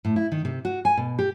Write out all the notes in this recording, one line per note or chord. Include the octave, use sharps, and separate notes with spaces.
A2
E4
D#3
C3
F#4
G#5
B2
G4